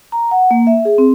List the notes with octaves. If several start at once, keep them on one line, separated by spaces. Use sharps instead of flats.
A#5
F#5
A#3
E5
G#4
C4